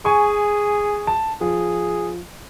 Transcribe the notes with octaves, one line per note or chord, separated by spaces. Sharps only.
G#4 G#5 C#6
A5
F3 G#4